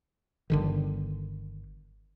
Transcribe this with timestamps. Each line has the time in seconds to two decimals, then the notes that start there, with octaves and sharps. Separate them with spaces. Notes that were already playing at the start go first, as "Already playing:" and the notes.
0.50 G1 D3 D#3